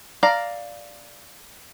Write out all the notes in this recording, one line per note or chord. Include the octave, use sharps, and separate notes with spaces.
D5 F5 A#5